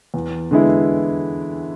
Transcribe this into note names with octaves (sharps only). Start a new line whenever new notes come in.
E2
D3 G#3 B3 E4